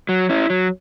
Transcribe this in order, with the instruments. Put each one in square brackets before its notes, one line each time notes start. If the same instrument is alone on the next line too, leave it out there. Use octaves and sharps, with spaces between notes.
[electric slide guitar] F#3
C#4 E4
F#3